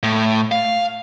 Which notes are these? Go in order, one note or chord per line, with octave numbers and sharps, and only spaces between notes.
A2
F5